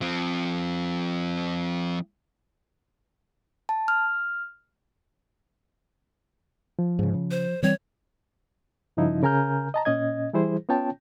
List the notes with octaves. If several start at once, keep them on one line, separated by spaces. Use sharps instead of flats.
F3 C4
A5
F6
F3
G#2 C#3
C#3
C5
E3 G3 C4 C#5
G2 C#3 F3 D#4 E4
C#3 A#4 G#5 A#5 F6 G6
D#5 A5 A#5
A#2 C#4 D#5 G#6
E3 G3 E4 G#4 C5
B3 C#4 F4 C#5 G5 A5